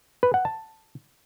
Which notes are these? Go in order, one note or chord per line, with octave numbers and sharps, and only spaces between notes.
B4
F#5
A5